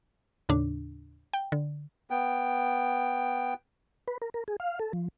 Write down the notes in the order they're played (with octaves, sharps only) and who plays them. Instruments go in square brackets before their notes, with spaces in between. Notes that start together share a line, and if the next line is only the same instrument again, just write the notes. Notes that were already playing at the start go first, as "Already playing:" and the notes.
[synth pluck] D#2 A2 C#3 D4
G5
D3
[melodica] B3 G5
[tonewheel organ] B4
A#4
A#4
G#4
F5
A4
F3